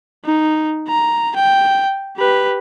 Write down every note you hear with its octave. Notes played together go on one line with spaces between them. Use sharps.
D#4
A#5
G5
G4 B4